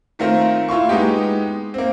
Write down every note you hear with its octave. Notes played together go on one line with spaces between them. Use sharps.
D#3 A3 C4 F4 A#4 C5
E4 F4 C6 C#6
G#3 B3 D#4 G4
A#3 C4